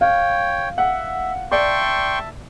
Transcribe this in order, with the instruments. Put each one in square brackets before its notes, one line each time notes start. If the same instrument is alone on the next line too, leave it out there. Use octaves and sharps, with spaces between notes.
[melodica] C#5 G5 [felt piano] F5
[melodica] E5 [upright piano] F#5
[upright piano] D5 [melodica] E5 A5 [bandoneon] G5 C6 C#6